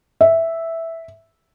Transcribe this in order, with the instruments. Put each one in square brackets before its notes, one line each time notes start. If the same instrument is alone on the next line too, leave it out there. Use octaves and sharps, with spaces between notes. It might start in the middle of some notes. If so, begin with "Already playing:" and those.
[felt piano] E5